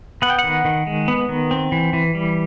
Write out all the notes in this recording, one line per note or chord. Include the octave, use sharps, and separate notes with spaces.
B3 F#5
G5
F#5
D#3
D#3
G#3
B3
D#3
C4
E3
E3
G3